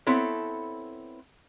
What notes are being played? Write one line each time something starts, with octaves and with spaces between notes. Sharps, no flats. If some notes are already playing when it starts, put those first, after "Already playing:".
B3 C4 E4 A4 C#5